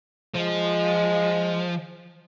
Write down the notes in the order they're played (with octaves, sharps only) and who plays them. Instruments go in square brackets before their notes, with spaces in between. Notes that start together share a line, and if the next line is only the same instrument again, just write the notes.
[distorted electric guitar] F3 [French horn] G#3